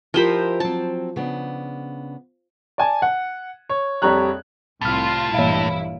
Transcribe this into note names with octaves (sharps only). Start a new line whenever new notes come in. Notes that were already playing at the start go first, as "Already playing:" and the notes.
F3 E4 G4 A#4 C5 B5
F#3 C4 A5
C#3 B3 D4
D5 G#5 A5
F#5
C#5
A#1 F2 G3 C#5 A#5 F#6
C2 A2 F4 F6 A6
A#1 G2 E3 E4 F5